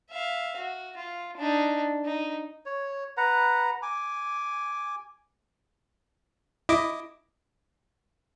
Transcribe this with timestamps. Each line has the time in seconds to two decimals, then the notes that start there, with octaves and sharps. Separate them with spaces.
0.10 E5 F5
0.57 F#4
0.97 F4
1.37 D4 D#4
2.05 D#4
2.66 C#5
3.17 B4 F#5 A#5
3.82 G#5 D6
6.69 E4 D#5 D6